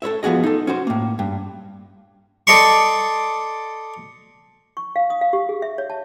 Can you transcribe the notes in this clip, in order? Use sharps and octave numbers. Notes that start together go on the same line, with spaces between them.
A4 B4 C#5 E5
F3 B3 F#4 G#4 D#5
D#4 A4
C#4 F#4 C5
A2 A#3
G2
A4 D5 D#5 A5 C6 C#6
C#6
F5
D#6
F5
G4
G#4
E5
C#5
A5